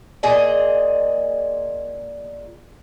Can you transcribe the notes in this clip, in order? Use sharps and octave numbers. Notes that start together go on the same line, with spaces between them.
A#2 G#4 D#5